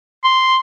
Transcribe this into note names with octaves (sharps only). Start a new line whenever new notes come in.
C6